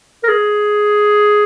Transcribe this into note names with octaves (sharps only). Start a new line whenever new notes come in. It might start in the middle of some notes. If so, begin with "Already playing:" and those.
A#4
G#4